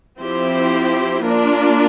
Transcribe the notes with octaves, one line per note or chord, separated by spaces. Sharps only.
F3 C4 E4 G4 C5
A#3 D4 F4 A#4